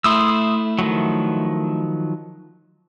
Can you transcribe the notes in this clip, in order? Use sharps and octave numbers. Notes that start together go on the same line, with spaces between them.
A3 E4 C6 D#6 E6
D#3 F3 F#3